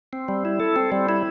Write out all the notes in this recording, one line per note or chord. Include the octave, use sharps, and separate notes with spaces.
C4
G3
E4
A4
C4
G3
E4